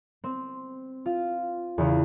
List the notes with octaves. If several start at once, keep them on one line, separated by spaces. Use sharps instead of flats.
C4
F4
E2 C#3